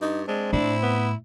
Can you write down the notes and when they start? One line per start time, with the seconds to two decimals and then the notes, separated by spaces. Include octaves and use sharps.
0.02 G2 D#4
0.28 G#3 C4 D4
0.53 A2 D4 E4
0.83 B3